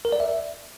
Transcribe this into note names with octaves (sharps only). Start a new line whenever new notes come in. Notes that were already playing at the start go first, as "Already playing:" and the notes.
A#4
D5
E5